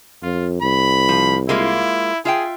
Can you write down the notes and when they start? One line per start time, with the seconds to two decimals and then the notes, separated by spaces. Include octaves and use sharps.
0.23 F2 F4
0.62 C2 B5
1.09 F3
1.49 G#3 A#3 E4 F4
2.25 F4 G#4 E5 G5